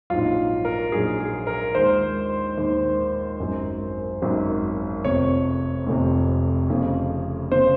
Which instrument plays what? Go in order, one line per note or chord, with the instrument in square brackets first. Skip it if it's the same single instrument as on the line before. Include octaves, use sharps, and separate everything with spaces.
[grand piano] A#1 G#2 F#3 F4
A#4
A#1 G#2 F#3 G#4
G#4
A#4
D#2 D#3 G#3 C5
D#2 D#3 G#3
G#1 F#2 D#3 F#3
G#1 F#2 D#3 F#3
F1 F2 C3 C#5
F1 F2 C3
F1 F2 C#3
C#3 C5